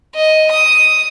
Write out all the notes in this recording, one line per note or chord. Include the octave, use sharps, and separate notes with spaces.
D#5
D#6